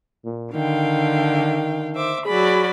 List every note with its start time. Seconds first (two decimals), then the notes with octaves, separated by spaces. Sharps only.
0.25 A#2
0.54 D3 D#3 F5 G5
1.95 C5 E5 D6
2.26 F#3 G#4 D5 B5